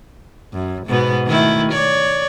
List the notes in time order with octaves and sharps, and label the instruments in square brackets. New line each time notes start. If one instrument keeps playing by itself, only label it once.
[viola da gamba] F#2
G#2 B2 B3
D#3 A3 E4
C#5 D5